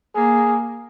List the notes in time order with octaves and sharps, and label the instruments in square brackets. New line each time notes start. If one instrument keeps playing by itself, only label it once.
[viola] A#3 [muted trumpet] G#4